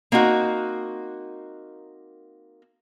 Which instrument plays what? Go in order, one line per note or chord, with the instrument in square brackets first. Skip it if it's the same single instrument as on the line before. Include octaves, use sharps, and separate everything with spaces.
[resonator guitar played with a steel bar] A#3 C4 D#4 F#4